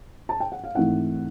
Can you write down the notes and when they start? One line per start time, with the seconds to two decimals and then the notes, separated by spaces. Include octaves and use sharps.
0.29 A5
0.40 G5
0.52 F#5
0.64 F5
0.75 G#2 E3 A3 C4 E4 F#5